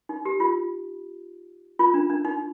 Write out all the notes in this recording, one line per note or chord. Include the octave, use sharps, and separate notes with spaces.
D#4
G4
F4
F4
D4
D4
D#4